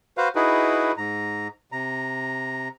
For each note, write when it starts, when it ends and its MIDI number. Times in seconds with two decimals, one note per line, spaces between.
0.17 0.28 66
0.17 0.28 71
0.17 0.28 72
0.17 0.28 77
0.35 0.92 63
0.35 0.92 64
0.35 0.92 66
0.35 0.92 68
0.35 0.92 71
0.97 1.48 44
0.97 1.48 82
1.72 2.68 48
1.72 2.68 82